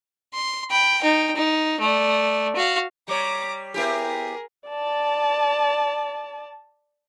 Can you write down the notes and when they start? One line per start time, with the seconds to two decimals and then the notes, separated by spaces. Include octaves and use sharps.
0.34 C6
0.71 G5 B5
1.01 D#4 G5
1.36 D#4
1.80 A3 D5
2.56 F#4 F5
3.08 G3 C#5 A#5 D6
3.74 B3 E4 G4 G#4 A#4
4.69 D5 A5